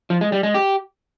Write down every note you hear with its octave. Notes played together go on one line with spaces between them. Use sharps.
F3
G#3
G3
G#3
G4